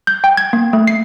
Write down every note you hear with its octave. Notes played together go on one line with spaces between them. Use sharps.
G6
G5
G#6
A#3
A3
C7